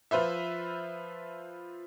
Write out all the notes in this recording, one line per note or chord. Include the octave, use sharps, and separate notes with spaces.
F3 F4 B4 C5 E5